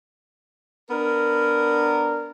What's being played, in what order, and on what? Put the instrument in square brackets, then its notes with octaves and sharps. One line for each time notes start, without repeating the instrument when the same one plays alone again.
[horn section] B3 D4 A#4